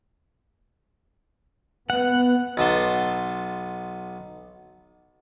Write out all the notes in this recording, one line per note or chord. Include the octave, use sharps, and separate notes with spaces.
B3 F#5
B1 B3 A5 C6